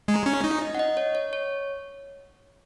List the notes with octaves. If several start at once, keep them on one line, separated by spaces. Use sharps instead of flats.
G#3
A#5
C#4
D#4
D#5
F#5
D#5
C#5
C#5
C#5